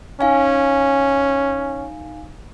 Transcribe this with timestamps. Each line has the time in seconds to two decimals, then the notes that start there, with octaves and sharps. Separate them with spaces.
0.21 C#4 D#4 F5 G#5